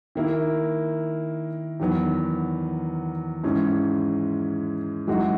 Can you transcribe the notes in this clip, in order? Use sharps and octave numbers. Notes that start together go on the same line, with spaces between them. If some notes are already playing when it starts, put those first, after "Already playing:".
D#3 A#3 E4
E2 D#3 F#3 B3
G#2 E3 G#3 C#4
F#2 E3 G#3 D#4 F#4